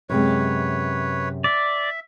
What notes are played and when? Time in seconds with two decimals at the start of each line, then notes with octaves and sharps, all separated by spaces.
0.10 F#2 C3 G#3 B4 C#5
1.44 D5 E5